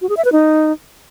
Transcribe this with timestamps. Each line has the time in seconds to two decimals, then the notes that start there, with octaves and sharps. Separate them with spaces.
0.02 F#4
0.09 G#4
0.17 E5
0.25 B4
0.32 D#4